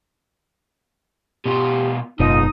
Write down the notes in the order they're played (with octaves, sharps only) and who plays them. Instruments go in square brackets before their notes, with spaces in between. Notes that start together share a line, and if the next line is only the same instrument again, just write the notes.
[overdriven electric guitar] B2 F4 [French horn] G4
[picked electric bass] F#1 B2 [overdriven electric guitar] G#2 [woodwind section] D#4 D#6 [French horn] F4